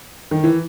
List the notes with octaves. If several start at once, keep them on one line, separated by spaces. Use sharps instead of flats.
D#3
E3